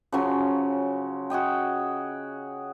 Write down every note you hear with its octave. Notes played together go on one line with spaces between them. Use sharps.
C#3 F3 F#3 C#4
F#4 G#4 D#5 G5